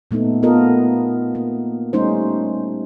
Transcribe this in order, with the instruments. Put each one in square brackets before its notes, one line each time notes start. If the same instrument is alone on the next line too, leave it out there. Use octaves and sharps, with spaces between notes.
[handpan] A#2 A3 B3 D#4
A3 B3 F4 A4 A#4 D#5
A#3
G3 A3 C#4 D#4 C5